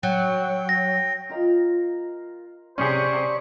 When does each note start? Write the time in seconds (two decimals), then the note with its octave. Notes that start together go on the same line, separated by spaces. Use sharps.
0.03 F#3 G5
0.69 A#6
1.29 F4 A#4 D#5 F5
2.78 C3 C#4 G#4 C5 D5 C#6